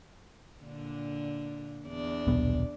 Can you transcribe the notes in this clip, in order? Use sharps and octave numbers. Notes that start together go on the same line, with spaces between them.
A#2 D3 D4
E2 D4 D5
D#1 B1 B3